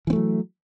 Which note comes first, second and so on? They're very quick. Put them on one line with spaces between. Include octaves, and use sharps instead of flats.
E3 C4 A3 F#3